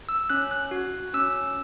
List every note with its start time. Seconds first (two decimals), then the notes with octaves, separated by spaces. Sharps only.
0.09 E6
0.30 C#4 F#6
0.51 F#6
0.71 F#4
1.14 C#4 E6